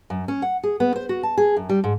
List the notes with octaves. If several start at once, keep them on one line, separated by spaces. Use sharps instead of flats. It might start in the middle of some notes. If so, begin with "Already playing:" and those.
F#2
C#4
F#5
G#4
B3
C5
F#4
A5
G#4
F#2
G3
G#2